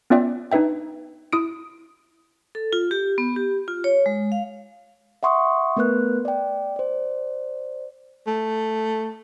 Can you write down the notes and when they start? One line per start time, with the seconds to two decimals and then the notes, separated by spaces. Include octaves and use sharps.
0.10 B3 C#4 F4 D5 E5 G5
0.52 D4 D#4 B4 E5 G5
1.33 E4 D#6 D7
2.55 A4
2.73 F4
2.91 G4
3.18 B3
3.36 G4
3.68 F4
3.84 C#5
4.06 G#3
4.32 F5
5.23 E5 F#5 C6 C#6 D#6
5.77 A3 B3 A#4 B4 F#6
6.25 D5 G5
6.76 C5 D5
8.27 A3